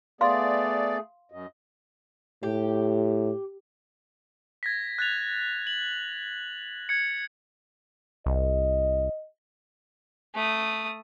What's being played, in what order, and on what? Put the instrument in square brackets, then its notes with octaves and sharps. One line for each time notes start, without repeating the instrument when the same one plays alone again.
[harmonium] A3 G#4 [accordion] B3 D5 [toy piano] F5 C6
[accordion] F#2 [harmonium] D#5
[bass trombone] A2 [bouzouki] G4
[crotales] G#6 A#6 B6
F#6 A6 F7
F#7
G#6 C#7
[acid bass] C2 [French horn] D#5
[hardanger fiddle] A3 D#6